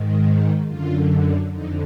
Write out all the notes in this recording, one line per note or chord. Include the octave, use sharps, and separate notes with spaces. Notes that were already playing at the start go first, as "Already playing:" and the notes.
Already playing: G#2 D#3
F#2 D3 F4
F2 D3 D#4